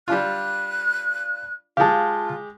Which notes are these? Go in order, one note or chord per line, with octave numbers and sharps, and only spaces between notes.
G3 D4 F4 F#6
G#3 F4 G4 F5 A5